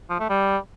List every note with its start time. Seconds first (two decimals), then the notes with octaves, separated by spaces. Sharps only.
0.10 F3
0.20 A3
0.30 G3